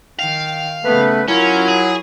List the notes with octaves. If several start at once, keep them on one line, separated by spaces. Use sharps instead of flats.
D#3 F5 G5
C#3 A3 B3 B4
F#3 C#4 E4 F4 A#4
G#4